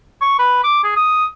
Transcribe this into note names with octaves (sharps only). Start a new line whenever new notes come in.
C#6
B4
D6
G#4
D#6